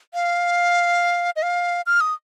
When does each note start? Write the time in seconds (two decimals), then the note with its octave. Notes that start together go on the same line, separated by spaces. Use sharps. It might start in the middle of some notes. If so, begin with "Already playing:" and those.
0.14 F5
1.36 D#5
1.43 F5
1.86 F6
2.01 D#6